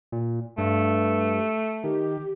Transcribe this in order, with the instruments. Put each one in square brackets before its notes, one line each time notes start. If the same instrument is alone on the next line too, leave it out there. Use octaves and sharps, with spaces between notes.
[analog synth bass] A#2
[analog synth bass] G2 [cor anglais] A3
[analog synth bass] D#3 [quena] G4